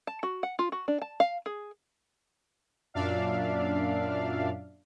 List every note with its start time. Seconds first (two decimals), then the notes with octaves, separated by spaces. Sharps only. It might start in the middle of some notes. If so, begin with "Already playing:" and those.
0.07 A5
0.23 F#4
0.43 F#5
0.59 F4
0.72 F#4
0.88 D4
1.02 A5
1.20 F5
1.46 G#4
2.94 F#2 A#2 D4 D5 E5 F5